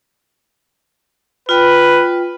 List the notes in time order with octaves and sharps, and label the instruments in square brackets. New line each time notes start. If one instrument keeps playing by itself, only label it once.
[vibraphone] F4 G5 B5 [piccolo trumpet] B4